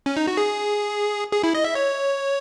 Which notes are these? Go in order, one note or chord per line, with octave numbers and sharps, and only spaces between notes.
C#4
D#4
F#4
G#4
G#4
E4
D#5
E5
C#5